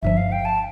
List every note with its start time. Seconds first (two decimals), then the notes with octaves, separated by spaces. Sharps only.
0.02 G1 G2 F3 E5
0.17 F5
0.32 G5
0.45 A5